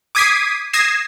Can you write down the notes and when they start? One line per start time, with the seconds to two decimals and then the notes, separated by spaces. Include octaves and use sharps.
0.15 D6 D#6 G#6 B6 C7 D#7
0.73 D#6 G#6 A#6 C7 E7